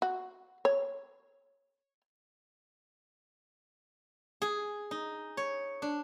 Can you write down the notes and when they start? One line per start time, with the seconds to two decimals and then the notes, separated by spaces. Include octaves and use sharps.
0.02 F#4
0.65 C#5
4.42 G#4
4.91 D#4
5.37 C#5
5.82 D4